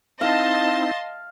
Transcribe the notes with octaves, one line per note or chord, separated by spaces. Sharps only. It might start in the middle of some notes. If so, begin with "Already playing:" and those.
C4 D#4 E4 D#5 F5 A5 C6